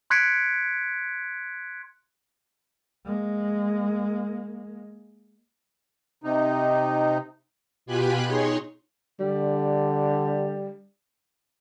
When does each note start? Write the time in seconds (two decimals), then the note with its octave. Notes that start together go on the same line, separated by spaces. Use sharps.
0.10 C6 F#6 G#6 B6 C#7 D7
3.05 G#3 A#3
6.24 C3 D#4
7.86 B2 F4 G4 G#5 B5 F#6
8.26 D#4 G#4 C#5 C6
9.20 D3 G3